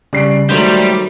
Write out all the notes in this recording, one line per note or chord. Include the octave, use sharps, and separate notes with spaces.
C#3 G3 D5 C7 D7
D#3 F#3 G3 A3 C5 G6